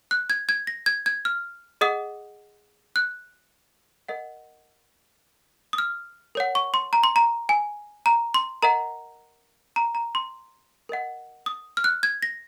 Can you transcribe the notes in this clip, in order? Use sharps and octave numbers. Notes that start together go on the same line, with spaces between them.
F#6
G#6
G#6
A#6
G#6
G#6
F6
G#4 D#5 F#5 D#6
F#6
A#4 D#5 F#5
D#6
F6
A#4 C#5 F#5
C#6
C6
A#5
C6
A#5
G#5
A#5
C6
A#4 D#5 F#5 A#5
A#5
A#5
C6
A#4 D#5 F#5
D#6
F6
F#6
G#6
A#6